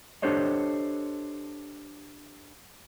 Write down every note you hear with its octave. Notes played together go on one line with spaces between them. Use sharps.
D4 G4 A4 C5 C#5 D#5